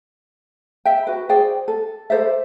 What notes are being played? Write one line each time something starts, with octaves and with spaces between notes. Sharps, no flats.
E5 G5
F#4 B4
G#4 C5 D5 G5
A4
A4 C5 D5 E5